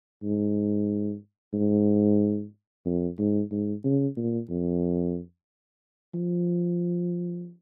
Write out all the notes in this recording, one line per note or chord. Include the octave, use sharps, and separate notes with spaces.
G#2
G#2
F2
G#2
G#2
C#3
A#2
F2
F3